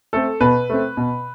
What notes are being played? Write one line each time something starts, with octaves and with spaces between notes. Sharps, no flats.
A3 C4 A4
B2 B4
A3 C4
B2